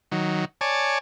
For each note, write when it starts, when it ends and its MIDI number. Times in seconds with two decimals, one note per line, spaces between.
0.12 0.45 51
0.12 0.45 54
0.61 0.98 73
0.61 0.98 74
0.61 0.98 80
0.61 0.98 81